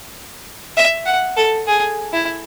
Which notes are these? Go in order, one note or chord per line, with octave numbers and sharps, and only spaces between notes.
E5
F#5
A4
G#4
E4